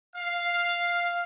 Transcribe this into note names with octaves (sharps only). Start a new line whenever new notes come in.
F5